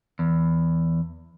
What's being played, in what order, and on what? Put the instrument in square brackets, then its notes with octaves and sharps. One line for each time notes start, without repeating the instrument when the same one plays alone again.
[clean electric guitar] E2